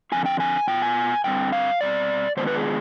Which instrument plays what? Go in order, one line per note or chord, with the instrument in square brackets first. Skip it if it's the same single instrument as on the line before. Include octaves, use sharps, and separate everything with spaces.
[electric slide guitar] D3 F3 C4 F4 G#5
G5
G#5
B2 B3 F4 G5
G#5
G2 D3 G3 C4 G5
F5
B2 G3 C4 D5
D#3 G#3 B3 D4 F4 C5
B4
G#4